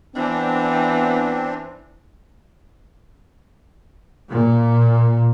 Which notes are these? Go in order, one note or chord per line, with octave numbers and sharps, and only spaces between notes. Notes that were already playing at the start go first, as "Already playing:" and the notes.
E3 B3 C4 D4
A#2